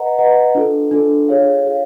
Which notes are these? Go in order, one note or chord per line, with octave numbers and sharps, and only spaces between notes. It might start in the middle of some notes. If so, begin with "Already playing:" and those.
Already playing: B4 D#5 F#5 A#5
B4 D#5 F#5 A#5
D4 F4 A4
D4 F4 A4
F4 G#4 C#5 F5
F4 G#4 C#5 F5